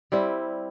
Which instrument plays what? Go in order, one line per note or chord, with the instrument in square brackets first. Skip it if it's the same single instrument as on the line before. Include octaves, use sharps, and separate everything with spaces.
[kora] G3 C4 E4